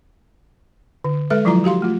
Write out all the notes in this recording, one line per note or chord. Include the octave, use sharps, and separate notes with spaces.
D3
G#3 A4 B4 E5
F3 F#3 E4 F4 A#5
F#4 G4 F5 C6
A3 F4